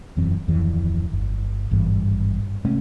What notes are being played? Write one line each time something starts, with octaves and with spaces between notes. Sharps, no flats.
E1 F#2 E3 C4
D1 F2 D#3 E3
G1
G#1 G2 E3 G3
C3 G#3 A3 C#4